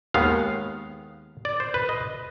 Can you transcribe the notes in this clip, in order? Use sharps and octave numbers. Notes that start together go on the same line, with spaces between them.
D#2 D#3 G#3 B3 F5
D5
C5
B4
D#5